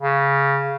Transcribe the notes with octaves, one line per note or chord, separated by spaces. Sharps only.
C#3